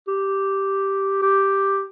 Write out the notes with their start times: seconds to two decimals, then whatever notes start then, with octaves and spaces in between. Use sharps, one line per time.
0.08 G4
1.22 G4